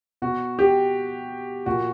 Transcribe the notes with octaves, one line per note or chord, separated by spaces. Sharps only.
B2 F#4
G4
A#2 F#4